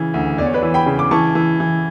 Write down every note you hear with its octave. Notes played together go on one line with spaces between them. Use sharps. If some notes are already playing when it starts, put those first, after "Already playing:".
Already playing: C#3 E3
D2
E2 D5
C#5
B4 D5
E3
G5 B5
C#3
D6
E3 A5 C#6
E3
E3